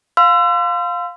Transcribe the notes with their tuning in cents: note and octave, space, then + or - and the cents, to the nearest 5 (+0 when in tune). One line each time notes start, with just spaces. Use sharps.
F5 +15 C6 -30 E6 +40